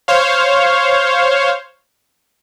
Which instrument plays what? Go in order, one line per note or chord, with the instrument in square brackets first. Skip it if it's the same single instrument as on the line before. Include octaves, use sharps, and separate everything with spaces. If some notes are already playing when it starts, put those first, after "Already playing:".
[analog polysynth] C5 C#5 F5